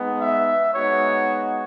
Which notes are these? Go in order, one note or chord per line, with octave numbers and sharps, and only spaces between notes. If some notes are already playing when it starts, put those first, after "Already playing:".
Already playing: G#3 B3 D#4
E5
G#3 B3 D#4 F#4 C#5